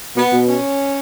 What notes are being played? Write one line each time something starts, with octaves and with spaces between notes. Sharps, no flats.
B2 B3
B2
C#4